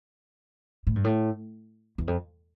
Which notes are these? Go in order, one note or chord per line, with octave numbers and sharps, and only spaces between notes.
A2
G2
A2
E2
F2